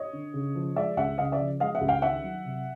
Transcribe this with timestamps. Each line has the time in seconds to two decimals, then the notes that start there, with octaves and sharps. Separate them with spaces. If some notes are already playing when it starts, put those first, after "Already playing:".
Already playing: C#5 D#5
0.13 D3
0.34 C#3
0.55 F3
0.76 G#3 D5 E5
0.97 C#2 E5 F#5
1.18 C#3 D#5 F5
1.32 D5 E5
1.39 F3
1.60 G#3 D#5 F5
1.75 E5 F#5
1.81 C#2
1.88 F5 G5
2.02 D#3 E5 F#5
2.24 F#3
2.45 C3